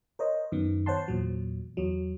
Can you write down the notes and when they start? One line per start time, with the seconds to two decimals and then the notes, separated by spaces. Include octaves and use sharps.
0.19 A#4 C5 C#5 D#5
0.52 F#2 D#3 B3
0.86 C5 C#5 F#5 A5 C6
1.08 E2 A#2 F#3
1.77 E2 F#3